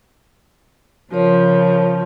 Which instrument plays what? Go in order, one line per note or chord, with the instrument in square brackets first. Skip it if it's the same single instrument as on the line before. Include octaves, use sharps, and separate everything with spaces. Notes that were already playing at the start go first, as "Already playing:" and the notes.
[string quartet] C#3 F3 [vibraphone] A#4 C#5